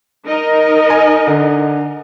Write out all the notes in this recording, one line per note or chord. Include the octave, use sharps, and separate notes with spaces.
D#4 A#4 D#5
G#5
D3